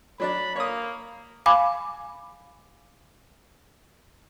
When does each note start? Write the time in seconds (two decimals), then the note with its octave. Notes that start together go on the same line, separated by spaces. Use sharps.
0.20 F#3 D4 D5 B5
0.56 A#3 C#5 D#6
1.46 F5 G#5 B5 D6